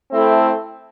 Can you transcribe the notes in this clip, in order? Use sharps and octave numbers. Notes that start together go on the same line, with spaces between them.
A3 C4 E4 A4